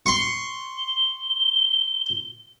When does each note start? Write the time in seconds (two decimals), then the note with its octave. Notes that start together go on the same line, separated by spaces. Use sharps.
0.06 C6 C#6
0.78 G7